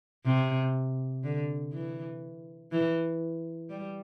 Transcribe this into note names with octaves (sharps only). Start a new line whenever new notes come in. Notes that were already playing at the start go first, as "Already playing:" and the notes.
C3
D3
E3
E3
G3